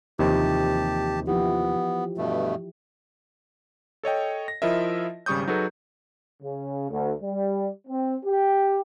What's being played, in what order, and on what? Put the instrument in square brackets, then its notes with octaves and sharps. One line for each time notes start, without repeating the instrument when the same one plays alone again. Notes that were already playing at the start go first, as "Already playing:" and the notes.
[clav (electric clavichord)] D#2 C3 [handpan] E3 F3 D#5 [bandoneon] G4 A5
[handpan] F3 E4 G4 [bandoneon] B3
[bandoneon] G2 B2 A3
[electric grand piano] A4 C#5 D#5 G5
A#6
F3 E4 F4 A#4 D#5 E5
G#1 C#3 G3 C#6 D#6 G6
F#3 D#4 F#4 G#4 A4 B4
[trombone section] C#3
D2
G3
C4
G4